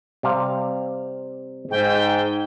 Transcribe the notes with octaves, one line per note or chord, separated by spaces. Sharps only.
C3 G3 F5
G#2 G5